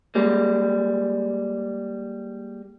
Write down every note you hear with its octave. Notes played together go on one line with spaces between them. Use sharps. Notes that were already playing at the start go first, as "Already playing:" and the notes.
G3 G#3 A#3